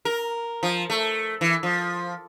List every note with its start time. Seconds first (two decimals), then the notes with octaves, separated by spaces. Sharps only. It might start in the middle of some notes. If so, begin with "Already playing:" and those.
0.05 A#4
0.63 F3
0.90 A3
1.41 E3
1.63 F3